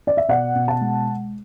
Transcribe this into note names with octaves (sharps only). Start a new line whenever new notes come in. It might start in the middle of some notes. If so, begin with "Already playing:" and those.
D5
E5
B2 D5 F#5
B2
F#5 A5
G#3